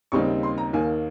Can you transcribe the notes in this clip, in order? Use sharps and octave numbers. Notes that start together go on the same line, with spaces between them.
D#2 C#3 G3 C4 D#4 C#6
C6
A#5
D#2 D#3 A#3 G#5